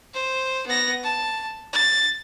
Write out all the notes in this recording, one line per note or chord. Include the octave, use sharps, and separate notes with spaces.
C5
B3 A#6
A5
A6